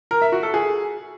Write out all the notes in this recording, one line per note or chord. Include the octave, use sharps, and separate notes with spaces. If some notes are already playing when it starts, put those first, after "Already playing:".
A#4
E5
F#4
A4
G#4